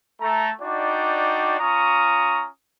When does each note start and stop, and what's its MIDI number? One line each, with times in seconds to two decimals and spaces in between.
0.21 0.50 57
0.21 0.50 82
0.61 1.57 62
0.61 1.57 63
0.61 1.57 66
0.61 1.57 74
0.61 1.57 79
1.59 2.47 61
1.59 2.47 65
1.59 2.47 82
1.59 2.47 85
1.59 2.47 87